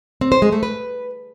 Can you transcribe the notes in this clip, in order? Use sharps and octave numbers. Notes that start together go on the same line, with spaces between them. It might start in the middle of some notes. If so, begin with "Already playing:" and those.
C4
C5
G#3
A3
B4